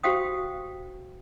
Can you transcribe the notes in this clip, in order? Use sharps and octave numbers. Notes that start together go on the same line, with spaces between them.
F#4 G4 C5 F5 G5 D#6